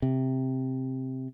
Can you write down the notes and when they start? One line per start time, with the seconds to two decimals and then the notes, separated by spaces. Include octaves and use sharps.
0.02 C3